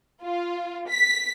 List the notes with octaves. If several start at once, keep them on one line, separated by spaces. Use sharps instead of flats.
F4
B6